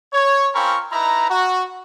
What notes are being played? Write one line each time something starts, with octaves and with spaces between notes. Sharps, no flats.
C#5
C4 C#4 F4 A#4 B5 C#6
D#4 E4 B4 A#5
F#4